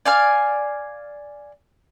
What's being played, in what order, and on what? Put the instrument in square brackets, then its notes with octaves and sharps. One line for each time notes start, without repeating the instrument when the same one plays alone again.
[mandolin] D5 F5 G#5 F6